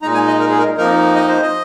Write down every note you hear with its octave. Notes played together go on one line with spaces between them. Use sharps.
A#2 G#3 D#4 A#5
G#5
D#5
A#4
G#4
A#4
F2 F3 A#3 D#4 A#4
D#5
C5
D#5